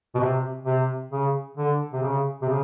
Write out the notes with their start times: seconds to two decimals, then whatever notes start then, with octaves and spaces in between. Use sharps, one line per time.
0.15 B2
0.20 C3
0.65 C3
1.11 C#3
1.57 D3
1.93 C3
2.03 C#3
2.42 C3
2.49 C#3